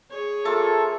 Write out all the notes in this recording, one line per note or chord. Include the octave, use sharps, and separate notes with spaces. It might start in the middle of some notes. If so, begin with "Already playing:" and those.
G#4 C#5
A#3 F4 A4 E5 A5